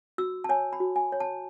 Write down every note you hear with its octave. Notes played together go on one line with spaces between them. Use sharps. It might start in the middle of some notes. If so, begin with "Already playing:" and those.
F#4 E6
A5
C#5 G#5
B5
F#4
G#5
C#5
A5